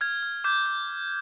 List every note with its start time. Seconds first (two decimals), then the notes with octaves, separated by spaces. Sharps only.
0.01 F6 G#6
0.23 F6
0.44 D6 G6
0.66 D6